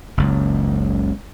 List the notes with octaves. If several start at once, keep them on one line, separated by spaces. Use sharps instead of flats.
F#1 C#2